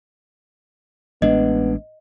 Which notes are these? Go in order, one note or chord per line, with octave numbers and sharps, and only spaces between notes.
A1 G#3 B3 D4 D#5